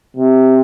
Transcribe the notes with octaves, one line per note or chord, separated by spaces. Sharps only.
C3